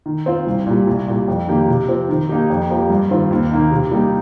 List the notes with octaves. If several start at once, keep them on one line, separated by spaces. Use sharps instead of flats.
D#3
C4 F4
C2
A#2 G3
C2
A#2 G3
F2
D#3 A#3 G4
C3
F3 C4
D#3
A#3 D#4 G4
F2
F3 A#3 G4
G2
D#3 C4 F4
D#2
D#3 A#3 D#4
C3
G3 A#3 D#4 G4